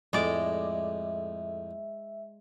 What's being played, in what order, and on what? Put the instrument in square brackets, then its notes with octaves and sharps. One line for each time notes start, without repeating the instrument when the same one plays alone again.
[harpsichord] F2 A2 [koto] G#3 D5 [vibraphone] E5